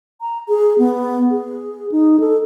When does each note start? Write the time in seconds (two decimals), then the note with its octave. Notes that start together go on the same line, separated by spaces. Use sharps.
0.21 A#5
0.48 G#4
0.78 B3
1.30 G#4
1.92 D#4
2.20 A4